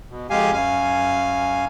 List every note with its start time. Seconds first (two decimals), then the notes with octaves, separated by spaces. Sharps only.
0.10 B2
0.30 F2 G#3 G4 F5 G#5
0.53 F#2 F5 G#5